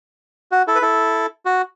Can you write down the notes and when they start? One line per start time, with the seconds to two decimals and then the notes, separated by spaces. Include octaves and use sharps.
0.52 F#4
0.67 E4 A4
0.75 B4
0.82 E4 A4
1.45 F#4